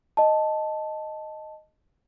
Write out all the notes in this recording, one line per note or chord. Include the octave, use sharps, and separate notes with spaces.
D#5 A5